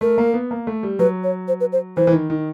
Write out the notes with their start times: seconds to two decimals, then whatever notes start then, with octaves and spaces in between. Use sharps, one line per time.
0.01 A3 A#4
0.18 A#3
0.34 B3
0.51 A#3
0.67 A3
0.83 G3
0.99 F#3 B4
1.24 C#5
1.48 C5
1.60 B4
1.73 C5
1.97 E3 C5
2.07 E3
2.13 D#3
2.30 D#3